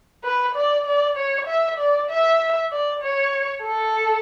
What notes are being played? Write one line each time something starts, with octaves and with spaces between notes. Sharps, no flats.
B4
D5
D5
C#5
E5
D5
E5
D5
C#5
A4